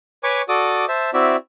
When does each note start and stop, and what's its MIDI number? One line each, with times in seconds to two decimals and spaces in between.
0.24 0.42 71
0.24 0.42 73
0.24 0.42 80
0.24 0.42 85
0.24 0.42 86
0.49 0.85 66
0.49 0.85 69
0.49 0.85 74
0.49 0.85 86
0.49 0.85 87
0.88 1.10 72
0.88 1.10 76
0.88 1.10 81
1.14 1.36 60
1.14 1.36 64
1.14 1.36 66
1.14 1.36 74
1.14 1.36 76